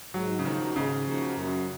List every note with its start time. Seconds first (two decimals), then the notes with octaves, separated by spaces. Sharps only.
0.14 G#2 F#3
0.39 C#3
0.45 D#3 F3 A#3 D#4 F#4
0.76 G#2 C#3
1.07 F3 A#3 D#4 F#4
1.37 F#2